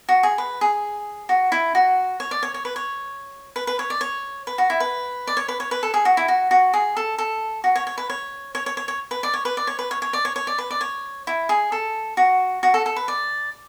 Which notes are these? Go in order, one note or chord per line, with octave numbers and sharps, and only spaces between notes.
F#4
G#4
B4
G#4
F#4
E4
F#4
C#5
D5
C#5
C#5
B4
C#5
B4
B4
C#5
D5
C#5
B4
F#4
E4
B4
D5
C#5
B4
C#5
B4
A4
G#4
F#4
E4
F#4
F#4
G#4
A4
A4
F#4
C#5
C#5
B4
C#5
C#5
C#5
C#5
C#5
B4
D5
C#5
B4
D5
C#5
B4
C#5
C#5
D5
C#5
C#5
D5
B4
D5
C#5
E4
G#4
A4
F#4
F#4
A4
A4
B4
D5